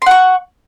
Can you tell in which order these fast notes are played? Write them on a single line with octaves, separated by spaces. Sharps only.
C6 F#5 C#6